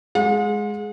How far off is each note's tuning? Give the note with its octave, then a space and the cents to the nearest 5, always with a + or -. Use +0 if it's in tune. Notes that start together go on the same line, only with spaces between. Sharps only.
G#3 +10 F#5 -45